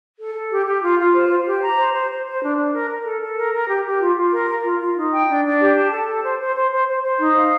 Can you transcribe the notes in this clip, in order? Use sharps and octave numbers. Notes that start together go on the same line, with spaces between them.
A4
A4
G4
G4
F4
F4
C5
C5
G4
A#5
C5
C5
C5
C5
D4
D4
A#4
A#4
A4
A4
A#4
A#4
G4
G4
F4
F4
A#4
A#4
F4
F4
D#4
G5
D4
D4
G4
A5
A4
A4
C5
C5
C5
C5
C5
C5
D#4
F5